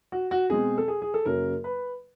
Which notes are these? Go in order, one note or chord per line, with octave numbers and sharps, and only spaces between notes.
F#4
F#4
B2 G#3 C4 G#4
A4
G#4
G#4
A4
F#2 C#3 F#3 A#3 A#4
B4